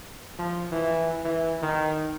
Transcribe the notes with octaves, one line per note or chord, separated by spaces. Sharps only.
F3
E3
E3
D#3